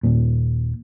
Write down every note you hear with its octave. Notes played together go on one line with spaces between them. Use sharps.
D#1 D#2 A#2